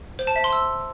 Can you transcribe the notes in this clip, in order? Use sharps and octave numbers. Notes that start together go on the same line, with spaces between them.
C5
A5
E5
C6
E6